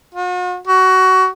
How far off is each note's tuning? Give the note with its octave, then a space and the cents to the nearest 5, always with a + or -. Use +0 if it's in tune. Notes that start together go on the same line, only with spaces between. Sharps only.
F#4 -45
F#4 +20